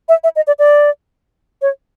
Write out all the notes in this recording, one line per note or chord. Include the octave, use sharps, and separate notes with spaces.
E5
E5
D#5
D5
D5
C#5